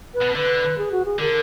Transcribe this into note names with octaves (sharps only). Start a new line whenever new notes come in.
B4
B2
D3 B4
G#4
F#4
G#4
D3 A#4